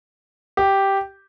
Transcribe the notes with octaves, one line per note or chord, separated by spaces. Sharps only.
G4